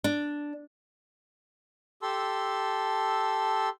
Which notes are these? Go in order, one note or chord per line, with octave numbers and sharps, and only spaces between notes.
D4
G4 A4 A5 C6 E6